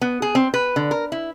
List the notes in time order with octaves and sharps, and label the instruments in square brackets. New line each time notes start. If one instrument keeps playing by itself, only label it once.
[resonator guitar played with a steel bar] B3
G#4
C4
B4
D3
A#4
E4